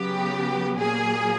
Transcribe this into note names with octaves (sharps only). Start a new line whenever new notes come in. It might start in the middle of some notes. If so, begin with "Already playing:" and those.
Already playing: C#3 F#3 B3 G4
A#2 F#3 A#3 G#4